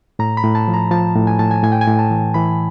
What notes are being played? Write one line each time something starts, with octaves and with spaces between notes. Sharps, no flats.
A2 A#5
B5
A2
A5
F3
A#5
F3 A5
A2
G#5
A2 A5
G#5
A2 G#5
G5
G#5
A2
A5
E3
E3 B5